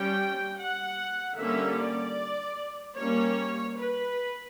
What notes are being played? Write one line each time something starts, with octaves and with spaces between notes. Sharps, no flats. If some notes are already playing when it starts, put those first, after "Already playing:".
Already playing: G3 C#4 G5
F#5
D3 G3 A#3 C#4 E5
D5
G3 A#3 C#4 C#5
B4